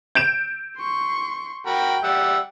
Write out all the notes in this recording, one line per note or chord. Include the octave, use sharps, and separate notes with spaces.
G6 D7 E7
C6 C#6
F#4 A#4 G5 B5
G3 E5 F#5